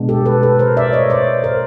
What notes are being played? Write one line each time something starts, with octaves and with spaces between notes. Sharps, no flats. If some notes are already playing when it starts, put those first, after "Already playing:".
Already playing: B2 G#3 B3 D4
G4 A4
A4 B4
A4 B4
A#4 C5
D5 E5
C#5 D#5
C5 D5
A#4 C5